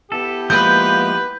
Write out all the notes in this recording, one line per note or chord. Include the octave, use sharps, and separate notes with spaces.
B3 E4 G4 A4
F3 G#3 A#3 B4 G6